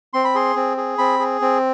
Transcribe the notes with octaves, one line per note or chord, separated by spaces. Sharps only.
C4 C6
B5
G#4 C6
C4
G#4
C4 B5
G#4
C4